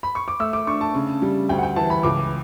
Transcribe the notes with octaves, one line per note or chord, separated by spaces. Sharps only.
B5
C#6
D6
A3 E6
D6
D4 C#6
A5
C#3
G3
D2 G5
F#5
G5
E3 A5
B5
C#2 D6